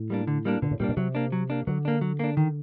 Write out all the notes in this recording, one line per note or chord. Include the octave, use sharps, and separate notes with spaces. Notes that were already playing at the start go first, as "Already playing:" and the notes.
Already playing: A2
G3 A#3 D4
D3
G3 A#3 D4
A#2 D3
A2
A#2 G3 A#3 D4
B2
C3 F#3
A#3 D4
F#3
A#3 D4
D3 F#3
A#3 D4
F#3
A#3 D4
D#3